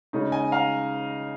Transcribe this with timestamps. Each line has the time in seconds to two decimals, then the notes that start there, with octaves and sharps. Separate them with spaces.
0.13 C#3 G#3 D#4
0.32 D#5 G#5
0.52 F5 A#5